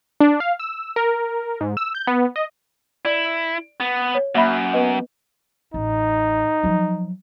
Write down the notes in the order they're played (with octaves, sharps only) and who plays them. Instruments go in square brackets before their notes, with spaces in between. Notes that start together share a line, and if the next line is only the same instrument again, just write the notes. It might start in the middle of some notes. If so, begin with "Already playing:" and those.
[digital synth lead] D4
F5
E6
A#4
G#2
E6
G6
B3
D#5
[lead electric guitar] E4 [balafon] D5
[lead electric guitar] B3
[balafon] C#5
[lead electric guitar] F#2 [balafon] A#3 E5 B5
[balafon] B3 B4 D#5
[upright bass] A1 [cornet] D#4
[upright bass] F3 F#3